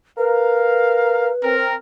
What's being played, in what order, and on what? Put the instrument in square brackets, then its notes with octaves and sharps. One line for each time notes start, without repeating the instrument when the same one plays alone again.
[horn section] A#4 F5 [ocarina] B4
[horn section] C4 A#4